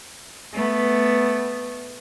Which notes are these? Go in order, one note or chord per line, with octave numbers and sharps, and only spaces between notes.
A3 B3